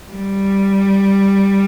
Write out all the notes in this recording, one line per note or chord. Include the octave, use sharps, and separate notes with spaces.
G3